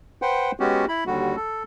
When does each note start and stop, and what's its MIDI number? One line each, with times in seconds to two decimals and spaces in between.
0.22 0.51 71
0.22 0.51 72
0.22 0.51 78
0.22 0.51 79
0.22 0.51 84
0.60 0.86 56
0.60 0.86 59
0.60 0.86 61
0.60 0.86 66
0.60 0.86 67
0.89 1.04 64
0.89 1.04 83
1.07 1.36 39
1.07 1.36 50
1.07 1.36 55
1.07 1.36 66
1.36 1.63 69